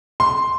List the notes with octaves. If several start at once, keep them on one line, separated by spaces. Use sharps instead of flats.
C6